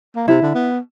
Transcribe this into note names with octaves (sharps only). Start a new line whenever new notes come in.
A#3
C3 E4
D3
B3